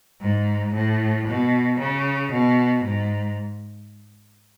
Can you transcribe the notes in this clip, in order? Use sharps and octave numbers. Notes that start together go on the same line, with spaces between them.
G#2
A2
B2
C#3
B2
G#2